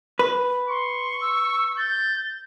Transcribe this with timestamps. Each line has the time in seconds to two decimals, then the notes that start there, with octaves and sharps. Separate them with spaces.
0.19 B4
0.69 C6 C#6
1.21 E6
1.78 G6 A6